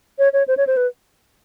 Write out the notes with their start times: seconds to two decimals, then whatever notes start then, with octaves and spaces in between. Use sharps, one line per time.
0.18 C#5
0.33 C#5
0.48 C5
0.57 C#5
0.67 C5
0.77 B4